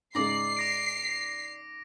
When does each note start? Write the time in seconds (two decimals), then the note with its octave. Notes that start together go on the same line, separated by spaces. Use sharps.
0.15 G#2 C#3 G#3 D5 A#5 C7
0.57 D6 A#6 D7